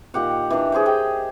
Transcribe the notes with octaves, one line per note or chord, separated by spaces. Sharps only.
A#2 D#3 G4 F#5
E3 D4
G#4 C5 D#5 G5
G4 G#4 D#5 G5